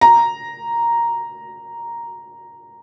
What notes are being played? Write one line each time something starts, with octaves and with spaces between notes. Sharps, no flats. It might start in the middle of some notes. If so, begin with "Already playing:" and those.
A#5